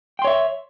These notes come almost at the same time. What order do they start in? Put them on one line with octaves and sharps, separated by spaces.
G5 C6 C#5 E5